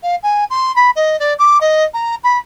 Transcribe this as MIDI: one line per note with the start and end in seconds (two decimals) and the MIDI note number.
0.03 0.15 77
0.23 0.44 80
0.50 0.74 84
0.76 0.90 83
0.96 1.18 75
1.19 1.33 74
1.39 1.58 86
1.61 1.84 75
1.94 2.15 82
2.23 2.38 83